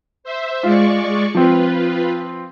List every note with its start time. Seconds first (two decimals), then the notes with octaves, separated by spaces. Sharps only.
0.24 C5 E5
0.63 G#3 F4 D5 C#6
1.35 F3 C4 F4 B4